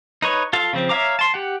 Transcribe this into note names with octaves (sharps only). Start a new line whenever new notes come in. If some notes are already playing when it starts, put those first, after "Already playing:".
D#4 B4 C#5
F4 A4 F5 A5
C#3 F3 C4
C#5 E5 F5 A#5 D6
A5 C6
G4 F#5